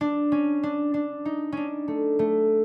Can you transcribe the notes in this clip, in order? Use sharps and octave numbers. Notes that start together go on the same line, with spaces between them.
D4
C#4
D4
D4
D#4
C#4 D4
A3
A3